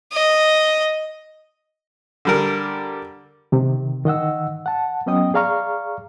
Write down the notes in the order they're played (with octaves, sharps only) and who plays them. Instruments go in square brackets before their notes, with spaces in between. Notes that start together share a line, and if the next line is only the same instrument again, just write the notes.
[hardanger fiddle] D#5
[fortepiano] D3 G3 A#4
[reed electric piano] C3 D#3
D#3 D#5 F#5 E6
F#5 A5
F#3 B3 C#4 D#5 G5 D#6
G#4 D5 F5 A#5 C#6 F6